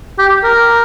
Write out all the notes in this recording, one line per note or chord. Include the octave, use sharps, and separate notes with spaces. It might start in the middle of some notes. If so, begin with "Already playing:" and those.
G4
A#4